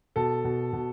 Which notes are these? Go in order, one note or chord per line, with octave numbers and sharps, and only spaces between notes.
B2 A4
B2
B2